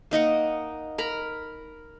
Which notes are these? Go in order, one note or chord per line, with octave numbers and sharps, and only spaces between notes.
A#3 D#4 D#5 F#5
A#4 A#5 B5